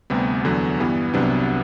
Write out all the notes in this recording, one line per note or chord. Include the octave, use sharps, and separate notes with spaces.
D2 C3 G3 B3
E2 D3 F#3
G2 E3 G3 B3
C2 C3 F#3 B3 D4